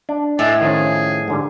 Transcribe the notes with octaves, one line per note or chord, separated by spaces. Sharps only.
D4
A2 D4 D#5 G#5
D#3 F3 C#4 G#4
G#2 D3 G3